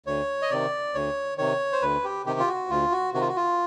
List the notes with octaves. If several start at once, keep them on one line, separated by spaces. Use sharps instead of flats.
D2 C#5
D#5
C3 D#3 D5
D2 C#5
C3 D#3 C#5
C5
D2 B4
G4
C3 D#3 G4
F4
F#4
D2 F4
F#4
C3 D#3 F#4
F4
F#4
F4